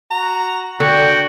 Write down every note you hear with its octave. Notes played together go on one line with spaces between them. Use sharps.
F#4 A#5
D3 F#4 D5 G5